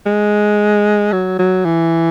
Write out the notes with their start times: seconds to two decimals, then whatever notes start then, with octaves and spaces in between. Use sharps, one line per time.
0.06 G#3
1.12 F#3
1.39 F#3
1.65 E3